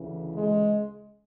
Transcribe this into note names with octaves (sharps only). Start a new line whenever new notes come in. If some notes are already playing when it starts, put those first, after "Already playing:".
Already playing: D2 C#3 E3
G#3